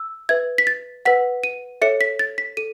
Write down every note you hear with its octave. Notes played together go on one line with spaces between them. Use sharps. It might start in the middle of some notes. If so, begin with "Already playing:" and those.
Already playing: E6
B4 E5 G#6
B6
A6
B4 F#5 B6
D#7
A4 C#5 E5 C#7
B6
A6
B6
A4 D#7